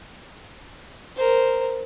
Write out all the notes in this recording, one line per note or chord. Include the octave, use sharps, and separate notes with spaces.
A#4 C5